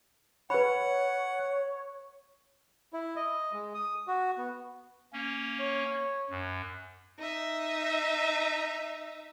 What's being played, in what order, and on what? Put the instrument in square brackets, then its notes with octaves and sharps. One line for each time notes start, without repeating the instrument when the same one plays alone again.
[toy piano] B4 B5 [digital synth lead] C#5 [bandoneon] F#5
[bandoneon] E4
D#5
G#3
D#6
F#4
B3
[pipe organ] A#3 C#4
[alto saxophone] C#5
[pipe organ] F#2
[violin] D#4 E5